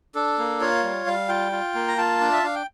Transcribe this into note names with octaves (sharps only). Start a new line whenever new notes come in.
D4 A4
A#3
F4 C#5
G3
G3 F5
F4 G5
F4
A#3
A#5
F4 A5
D4 D5
E5
D4 F5
G5